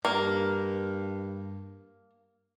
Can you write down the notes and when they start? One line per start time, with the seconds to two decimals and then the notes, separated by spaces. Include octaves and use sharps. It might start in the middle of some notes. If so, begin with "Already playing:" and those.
0.05 G2 A#3